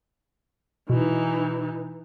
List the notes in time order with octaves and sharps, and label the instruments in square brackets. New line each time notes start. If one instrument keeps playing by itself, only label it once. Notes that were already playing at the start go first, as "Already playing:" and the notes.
[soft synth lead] B2 [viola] E3 D#4